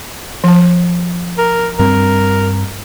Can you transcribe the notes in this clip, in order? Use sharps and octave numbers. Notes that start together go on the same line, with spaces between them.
F3 A5
A#4
G2 G3 C4 A#4